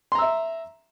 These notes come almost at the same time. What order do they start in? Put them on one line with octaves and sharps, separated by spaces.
C6 A#5 E6 E5